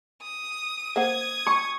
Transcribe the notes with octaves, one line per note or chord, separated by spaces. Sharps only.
D#6
A#3 C5 F#5 D#6 G#6
C#6